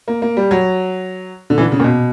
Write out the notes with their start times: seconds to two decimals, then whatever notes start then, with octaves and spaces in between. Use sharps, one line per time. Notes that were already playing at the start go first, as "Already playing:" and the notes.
0.08 A#3
0.22 A#3
0.37 G3
0.51 F#3
1.50 D3
1.58 E3
1.61 D3
1.72 C#3
1.80 A#2
1.84 B2